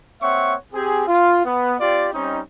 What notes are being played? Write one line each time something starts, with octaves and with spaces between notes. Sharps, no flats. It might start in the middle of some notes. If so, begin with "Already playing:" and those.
A#3 C4 C#5 E5 F#5 C#6
C4 G4 G#4
F4
B3
C4 F4 G4 D5
G3 C4 C#4 D#4